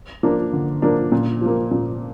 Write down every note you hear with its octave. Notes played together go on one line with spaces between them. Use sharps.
F3 A#3 D4
D3
F3 A#3 D4
A#2
F3 A#3
A#2